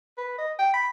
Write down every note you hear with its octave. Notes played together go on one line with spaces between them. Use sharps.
B4
D#5
G5
B5